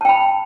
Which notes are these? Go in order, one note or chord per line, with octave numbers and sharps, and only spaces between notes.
G5 A5 B5